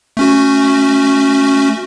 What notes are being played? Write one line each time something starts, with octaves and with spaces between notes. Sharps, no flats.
A3 C#4 F#4